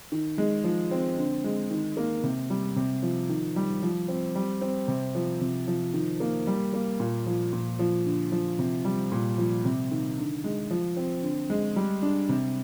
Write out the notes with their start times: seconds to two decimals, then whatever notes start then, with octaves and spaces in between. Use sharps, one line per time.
0.12 D#3
0.38 G#3
0.64 F3
0.91 C4
1.18 D3
1.44 G#3
1.71 D#3
1.97 A#3
2.23 C3
2.50 G3
2.76 C3
3.03 F3
3.29 D#3
3.56 G3
3.83 F3
4.08 C4
4.35 G3
4.61 C4
4.88 C3
5.15 F3
5.41 C3
5.67 F3
5.93 D#3
6.20 A#3
6.47 G3
6.73 A#3
7.00 A#2
7.26 F3
7.53 A#2
7.79 F3
8.06 D3
8.32 F3
8.59 C3
8.85 G3
9.12 A#2
9.38 F3
9.65 C3
9.91 D#3
10.18 D3
10.44 G#3
10.71 F3
10.96 C4
11.23 D3
11.50 G#3
11.76 G3
12.02 D4
12.29 C3